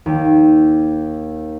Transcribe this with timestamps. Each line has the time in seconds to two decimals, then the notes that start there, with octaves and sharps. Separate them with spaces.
0.06 D#2